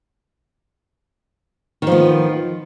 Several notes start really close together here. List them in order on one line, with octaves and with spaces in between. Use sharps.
D#3 F3 B3